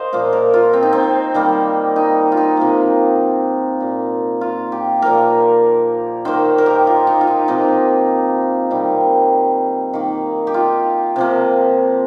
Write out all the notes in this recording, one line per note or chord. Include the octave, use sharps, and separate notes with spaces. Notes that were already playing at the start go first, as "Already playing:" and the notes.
Already playing: A#4 C5 D#5 F5
A#2 F3 A#3
A#4
F4
C4
D#4
C4
D#3 G3 A#3
D#4
F4
D#4
C3 F3 A#3
A#2 A#3
F4
G4
A#2 F3 A#3 A#4
D#3 A#3 C5
A#4
G4
F4
D#4
F4
D#4
C3 F3 A#3 D#4
C3 D#3 G3
D#3 A#3
G4
F4
C3 F3 A#3